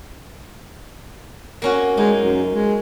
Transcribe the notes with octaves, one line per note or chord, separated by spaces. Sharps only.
A#3 C#4 F#4
G#3 D#4
F#2
G#3